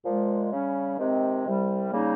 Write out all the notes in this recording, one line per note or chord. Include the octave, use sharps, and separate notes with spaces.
A#2 F3 G#3
C#3 G3 C#4
C3 D#3 G#3 C4
C2 C3 G3
C#3 G3 A#3 D#4